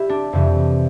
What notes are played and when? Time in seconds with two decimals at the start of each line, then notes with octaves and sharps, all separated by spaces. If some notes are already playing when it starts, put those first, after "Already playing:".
Already playing: G3 E4 G4
0.09 D4
0.33 F2 C3 E3 G3